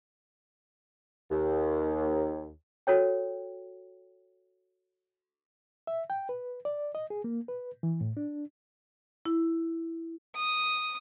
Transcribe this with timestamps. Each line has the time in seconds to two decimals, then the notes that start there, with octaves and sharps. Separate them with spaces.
1.31 D#2
2.87 F#4 A4 C#5 G5
5.87 E5
6.10 G5
6.29 B4
6.65 D5
6.95 D#5
7.10 G#4
7.24 A#3
7.48 B4
7.83 E3
8.01 A2
8.17 D4
9.25 E4
10.36 D#6